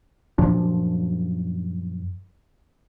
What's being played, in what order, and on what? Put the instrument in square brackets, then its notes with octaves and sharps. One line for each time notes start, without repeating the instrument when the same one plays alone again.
[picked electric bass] F#2 A#2 F3 D4